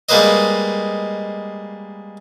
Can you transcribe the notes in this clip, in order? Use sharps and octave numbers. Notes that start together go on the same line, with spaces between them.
G3 G#3 A#3 B4 C5 D#5